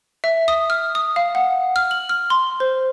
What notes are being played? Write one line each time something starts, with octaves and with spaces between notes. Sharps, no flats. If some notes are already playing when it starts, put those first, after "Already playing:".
E5
D#6
F6
D#6
F5
F#5
F6
F#7
F6
C6
C5